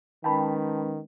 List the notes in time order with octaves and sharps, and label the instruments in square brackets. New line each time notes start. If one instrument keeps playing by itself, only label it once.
[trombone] D#3 [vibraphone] G#3 C#4 B4 [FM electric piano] G5 A5 B5